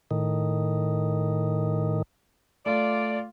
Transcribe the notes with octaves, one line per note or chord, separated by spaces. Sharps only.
A2 D#3
A3 F4 D5